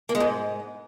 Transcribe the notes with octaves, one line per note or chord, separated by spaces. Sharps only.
A#3
G#3
G#2